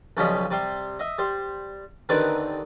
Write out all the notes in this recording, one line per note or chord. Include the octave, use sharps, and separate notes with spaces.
B1 C#3 F3 G3 D#5 B5
C3 G3 C6
D#5 E5
G3 C5
D#2 D3 C4 D#4 B4 D5